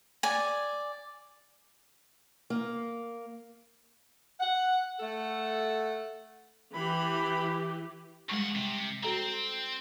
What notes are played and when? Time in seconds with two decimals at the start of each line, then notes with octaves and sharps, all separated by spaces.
0.23 D5 G#5
2.50 A#3
4.40 F#5
5.00 A3 A4 F#5
6.75 E3 G4 B5
8.29 E2 G3 G#3 F#5 C#6
8.55 C3
9.03 C4 F#4 A4 A#5